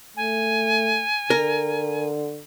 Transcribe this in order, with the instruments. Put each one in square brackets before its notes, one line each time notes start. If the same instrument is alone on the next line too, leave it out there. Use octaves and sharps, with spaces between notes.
[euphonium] A3 [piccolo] G#5
[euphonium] D3 [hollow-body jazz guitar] A#4